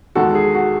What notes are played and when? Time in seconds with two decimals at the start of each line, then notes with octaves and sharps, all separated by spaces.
0.15 E2 D#3 G#3 F#4 A4
0.35 G#4
0.55 F#4